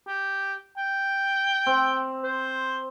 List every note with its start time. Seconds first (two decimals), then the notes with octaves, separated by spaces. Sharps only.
0.07 G4
0.77 G5
1.66 C4
2.24 C5